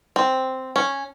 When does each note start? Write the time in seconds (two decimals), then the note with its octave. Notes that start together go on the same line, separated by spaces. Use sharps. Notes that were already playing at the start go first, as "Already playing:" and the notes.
0.16 C4
0.76 C#4